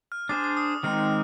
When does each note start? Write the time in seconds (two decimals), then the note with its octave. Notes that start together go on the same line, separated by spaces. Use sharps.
0.12 F6
0.29 D4 G#4 C5 D6
0.44 D6
0.57 D#6
0.83 D#3 G#3 C4 D#4 F6